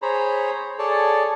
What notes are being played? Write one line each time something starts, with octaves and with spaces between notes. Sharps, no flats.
G#4 C5 C#5 A#5 B5
G#4 A4 C#5 D5 A5